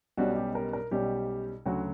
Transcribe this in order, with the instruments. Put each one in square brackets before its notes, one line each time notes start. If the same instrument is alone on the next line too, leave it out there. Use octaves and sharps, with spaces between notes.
[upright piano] B1 B2 G3 C#4 F#4
G4
A#4
A#4
B1 B2 G3 C#4 G4
D2 C#3 F#3 F#4